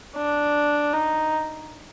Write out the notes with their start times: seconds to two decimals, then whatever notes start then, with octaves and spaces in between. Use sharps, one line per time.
0.16 D4
0.94 D#4